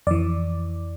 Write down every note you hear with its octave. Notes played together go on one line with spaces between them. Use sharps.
F2 E3 D5